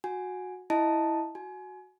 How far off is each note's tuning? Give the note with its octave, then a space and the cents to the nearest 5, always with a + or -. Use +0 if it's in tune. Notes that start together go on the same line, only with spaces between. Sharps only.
F#4 -15 G#5 +0
E4 +0 D#5 +0 A5 +0
F#4 +0 G#5 +30